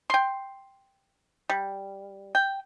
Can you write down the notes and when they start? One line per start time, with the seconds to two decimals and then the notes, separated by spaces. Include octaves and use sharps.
0.10 G5 C6
1.50 G3
2.35 G5